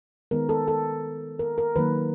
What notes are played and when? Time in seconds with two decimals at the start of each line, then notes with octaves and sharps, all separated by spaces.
0.31 D#3 G#3 B3 A#4
0.49 A4
0.68 A4
1.39 A#4
1.58 A#4
1.76 D#3 F#3 A#3 B4